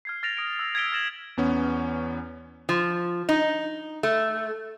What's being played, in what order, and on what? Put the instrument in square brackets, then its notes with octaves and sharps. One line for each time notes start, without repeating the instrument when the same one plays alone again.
[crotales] F6 G#6 C7
F6 A6 A#6 D7 F7
D#6 A#6 D7
E6
G#6 A6 B6 D7 G7
F6 A6 A#6 E7 F#7
[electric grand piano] E2 B3 C#4
[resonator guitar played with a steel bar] F3
D#4
A3